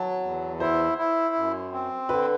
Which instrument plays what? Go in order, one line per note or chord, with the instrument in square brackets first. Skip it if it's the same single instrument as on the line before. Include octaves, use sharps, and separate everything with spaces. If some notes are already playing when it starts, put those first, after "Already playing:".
Already playing: [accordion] F#3 [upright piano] A5
[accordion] E2
[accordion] E4 [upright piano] C5
[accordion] E4
F#2
C4
[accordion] D3 [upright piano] B4